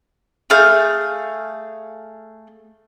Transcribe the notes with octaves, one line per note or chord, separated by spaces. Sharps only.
A3 G#4 F5 G6